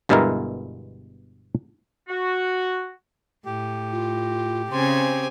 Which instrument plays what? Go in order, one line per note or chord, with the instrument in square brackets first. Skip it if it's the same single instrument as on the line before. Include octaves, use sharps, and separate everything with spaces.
[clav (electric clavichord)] G1 G2 B2 G#3 E4 A#4
[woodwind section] F#4
[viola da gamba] A2 [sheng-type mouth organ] G4
[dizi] F4
[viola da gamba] C#3 [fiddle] C4 G#5 [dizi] C6